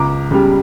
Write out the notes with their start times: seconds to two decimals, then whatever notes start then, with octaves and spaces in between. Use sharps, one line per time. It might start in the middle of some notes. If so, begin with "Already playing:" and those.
Already playing: C#2 A#5 D6
0.31 C#3 G3